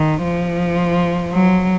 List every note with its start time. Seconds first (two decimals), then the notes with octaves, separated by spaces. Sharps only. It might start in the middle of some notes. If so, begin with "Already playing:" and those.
Already playing: D#3
0.23 F3
1.32 F#3